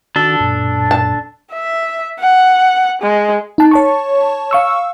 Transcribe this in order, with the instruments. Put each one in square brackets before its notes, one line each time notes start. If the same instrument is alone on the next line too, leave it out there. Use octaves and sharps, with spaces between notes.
[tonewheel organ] D#3 F#4 [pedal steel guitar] D4 A4
[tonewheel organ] F#2 A#2
[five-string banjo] A5
[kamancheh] E5
F#5
G#3
[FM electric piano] D#4 A5
C#5 A5 C#6
F5 C#6 E6